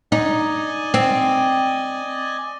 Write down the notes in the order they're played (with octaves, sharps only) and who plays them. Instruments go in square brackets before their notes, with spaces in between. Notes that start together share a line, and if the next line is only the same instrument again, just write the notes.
[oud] D#4 [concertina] D5 D#5 G#5
[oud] C4